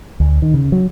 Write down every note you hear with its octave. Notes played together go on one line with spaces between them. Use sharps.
D2
D#3
C#3
F#3